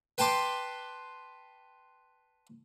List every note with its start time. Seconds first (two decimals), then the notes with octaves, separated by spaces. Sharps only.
0.18 B4 G5 A5 C6 D6